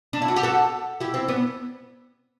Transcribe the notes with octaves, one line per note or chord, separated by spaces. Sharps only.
D4
E4
F#4
G4
F#4 A4
E4 G4
C4 E4
B3 D4